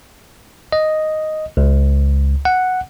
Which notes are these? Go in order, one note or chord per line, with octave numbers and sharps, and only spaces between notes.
D#5
C#2
F#5